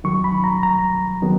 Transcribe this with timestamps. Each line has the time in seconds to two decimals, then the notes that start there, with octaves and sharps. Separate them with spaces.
0.04 D#2 D#3 F#3 C#6
0.24 B5
0.44 A#5
0.63 A#5
1.22 D#3 F#3 B3